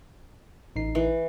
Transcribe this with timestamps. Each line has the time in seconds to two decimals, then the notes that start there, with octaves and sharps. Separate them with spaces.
0.76 A1 D#4 C7
0.95 E3